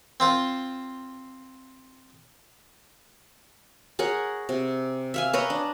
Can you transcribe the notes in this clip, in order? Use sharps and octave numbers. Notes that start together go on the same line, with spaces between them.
C4 F4 C5
G#4 A#4 C#5 F#5
C3
E5 F5 G#5
B4 C#5 D#5 A#5
D4